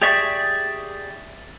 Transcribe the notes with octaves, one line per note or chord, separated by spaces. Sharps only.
G4 G#4 D5 E5 C#6